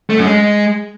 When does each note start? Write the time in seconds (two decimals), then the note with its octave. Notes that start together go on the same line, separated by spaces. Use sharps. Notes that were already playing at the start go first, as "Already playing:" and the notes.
0.10 A3
0.18 F#2
0.26 G#3